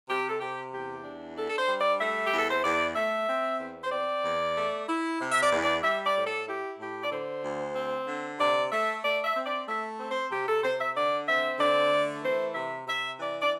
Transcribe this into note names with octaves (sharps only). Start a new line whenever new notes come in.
C3 G4
A4
C3 G4
E2 G4
D4
D4 A4
A4
C5
G3
D5
A3 E5
G4
E2
A4
C5
E2 D5
A3 E5
C4
E2
C5
C4 D5
E2
A3
E4
C3
E5
D5
E2
D5
G3 E5
D5
A2
A4
E4 G4
A2 G4
D5
D3 C5
D2
C4
D3
C3 D5
A3 E5
A3 D5
E5
C4
D5
A3 E5
C4
C5
C3 G4
A4
C3 C5
E5
D3 D5
C4 E5
D3 D5
A3
E3 C5
C3 E5
C3 E5
E3 D5
D5